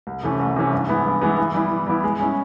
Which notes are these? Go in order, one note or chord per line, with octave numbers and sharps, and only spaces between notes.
C2
C3 E3 A3 C#4
C2
C3 E3 A3 C#4
G2
E3 G#3 B3 E4
G2
E3 G#3 B3 E4
E3
G3 B3 E4
E3
G3 B3 E4
G#3
C#4 E4